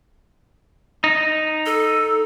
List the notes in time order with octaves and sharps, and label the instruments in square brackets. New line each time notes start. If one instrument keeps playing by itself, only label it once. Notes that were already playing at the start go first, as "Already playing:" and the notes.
[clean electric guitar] D#4
[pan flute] A4